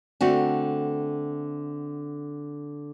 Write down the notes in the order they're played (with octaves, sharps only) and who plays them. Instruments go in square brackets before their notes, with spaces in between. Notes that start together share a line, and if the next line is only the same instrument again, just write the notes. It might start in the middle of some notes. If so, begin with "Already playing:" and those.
[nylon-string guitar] D3 A3 C4 F#4